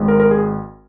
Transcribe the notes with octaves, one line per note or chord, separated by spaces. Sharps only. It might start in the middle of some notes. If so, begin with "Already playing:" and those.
Already playing: G#1 G#2 G#3
A#4
A#4
G#4